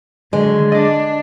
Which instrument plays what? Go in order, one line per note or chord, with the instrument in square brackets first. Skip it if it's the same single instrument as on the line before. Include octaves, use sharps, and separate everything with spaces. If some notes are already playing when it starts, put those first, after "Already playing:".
[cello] D3 F#3 [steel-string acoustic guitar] G#3
[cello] D4 [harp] D#5 D6